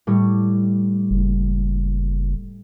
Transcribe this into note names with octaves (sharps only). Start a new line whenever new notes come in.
A2 G3 C#5
F#1